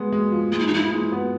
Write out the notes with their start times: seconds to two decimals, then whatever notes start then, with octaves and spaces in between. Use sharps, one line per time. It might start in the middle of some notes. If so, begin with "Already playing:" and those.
Already playing: G#3 B3
0.12 G#3
0.32 F3
0.52 G#3 F4
0.59 E4
0.67 D#4
0.72 F3 E4
0.92 G#3
1.12 B3